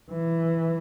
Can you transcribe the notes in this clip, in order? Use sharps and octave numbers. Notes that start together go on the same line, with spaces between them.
E3